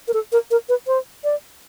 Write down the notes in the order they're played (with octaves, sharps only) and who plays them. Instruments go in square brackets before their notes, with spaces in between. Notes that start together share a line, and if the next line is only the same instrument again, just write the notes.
[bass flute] A#4
A4
A#4
A#4
B4
C5
D5